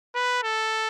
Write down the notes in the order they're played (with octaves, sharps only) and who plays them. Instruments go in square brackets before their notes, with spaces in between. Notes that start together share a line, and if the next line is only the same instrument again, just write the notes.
[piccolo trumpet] B4
A4